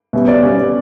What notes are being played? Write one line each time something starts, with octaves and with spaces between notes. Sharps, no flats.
B2 G3 C#4 E5
D5
B2 G3 C#4 C#5